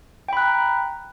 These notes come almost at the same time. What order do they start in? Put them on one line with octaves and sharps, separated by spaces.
G5 B5 F#6 A#5